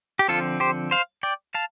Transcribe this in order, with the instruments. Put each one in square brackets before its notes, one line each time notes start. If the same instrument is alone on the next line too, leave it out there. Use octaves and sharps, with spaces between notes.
[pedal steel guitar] G4
D3 F3 C4 F4 A4
G4 C5
C5 F5
D5 G5
F5 A5